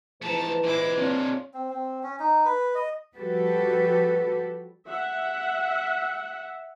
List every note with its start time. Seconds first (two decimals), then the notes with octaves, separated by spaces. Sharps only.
0.22 G#2 E3 F3 A3 B4 A5 A#5
0.64 A#2 G#3 E4 D6
0.98 C4 D4 F4 C#5
1.54 C4
1.70 C4
2.03 C#4
2.20 D#4
2.45 B4
2.75 D#5
3.16 F3 G3 F#4 G4 A4 B4
4.89 E5 F#5